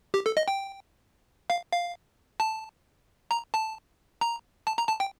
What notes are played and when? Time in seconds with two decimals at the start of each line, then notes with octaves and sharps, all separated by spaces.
0.14 G4
0.26 A4
0.37 D#5
0.48 G5
1.50 F5
1.72 F5
2.40 A5
3.31 A#5
3.54 A5
4.21 A#5
4.67 A5
4.78 A#5
4.88 A5
5.00 G5